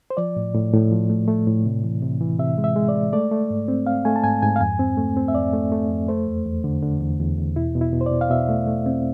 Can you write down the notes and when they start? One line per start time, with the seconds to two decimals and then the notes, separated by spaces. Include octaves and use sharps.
0.10 C5
0.17 F3 D5
0.36 A2
0.55 A2
0.73 A2
0.91 F3
1.10 A3
1.28 A3
1.47 A2
1.66 C3
1.84 E3
2.02 C3
2.21 E3
2.39 C3 E5
2.58 G#3
2.64 E5
2.76 G#3
2.89 D5
2.95 G#3
3.13 A3 D5
3.32 A3
3.51 G#2
3.68 C4
3.87 C4 F5
4.05 A3 G#5
4.16 A5
4.24 G#2 G#5
4.42 G#2 G#5
4.56 F5
4.61 F2 G#5
4.79 C4
4.97 A3
5.17 C4
5.28 E5
5.35 F2 D5
5.53 A3
5.72 A3
5.90 F2
6.08 A3 C5
6.27 E2
6.46 E2
6.64 D3
6.82 D3
7.01 E2
7.20 E2
7.38 E2
7.56 B2 E4
7.75 B2
7.81 E4
7.93 B2
8.01 C5
8.06 D5
8.11 B2
8.21 F5
8.30 B2 E5
8.49 A3
8.67 A3
8.86 C4